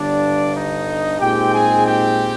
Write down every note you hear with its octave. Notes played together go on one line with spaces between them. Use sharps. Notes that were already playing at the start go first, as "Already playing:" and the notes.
Already playing: G1 G2 D3 D4 D5
D#4 D#5
A#2 G#3 C4 D#4 G4 G5
G#4 G#5
G4 G5